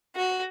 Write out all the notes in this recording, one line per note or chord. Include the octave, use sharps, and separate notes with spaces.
F#4